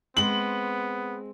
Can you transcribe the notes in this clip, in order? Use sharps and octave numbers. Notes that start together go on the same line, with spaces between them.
G#3 B3 C4 F#7